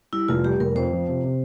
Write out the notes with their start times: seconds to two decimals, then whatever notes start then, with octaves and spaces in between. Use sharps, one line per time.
0.13 G3 E4
0.28 F1 F4
0.45 G3 G4
0.60 F1 A#4
0.75 F2 C5
0.92 F3
1.08 C3
1.24 C3